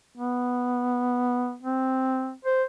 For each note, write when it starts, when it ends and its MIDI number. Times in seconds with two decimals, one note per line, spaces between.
0.17 1.56 59
1.62 2.34 60
2.45 2.64 72